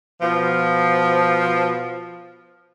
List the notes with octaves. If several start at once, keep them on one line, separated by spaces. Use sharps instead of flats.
B2 F3